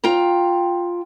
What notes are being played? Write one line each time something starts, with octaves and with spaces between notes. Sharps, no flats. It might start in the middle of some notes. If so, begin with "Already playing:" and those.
F4 G5 A#5